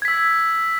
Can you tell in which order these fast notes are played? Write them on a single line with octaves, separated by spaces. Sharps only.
G#6 B6 E6